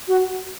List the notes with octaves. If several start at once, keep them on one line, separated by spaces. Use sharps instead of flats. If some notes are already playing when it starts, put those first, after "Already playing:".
F#4